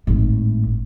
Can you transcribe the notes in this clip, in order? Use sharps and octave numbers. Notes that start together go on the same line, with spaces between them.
G#1 A2